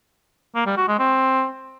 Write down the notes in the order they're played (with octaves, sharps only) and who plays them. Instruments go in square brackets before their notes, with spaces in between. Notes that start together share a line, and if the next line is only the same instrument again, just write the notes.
[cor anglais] A#3
G3
F#4
G#3
C4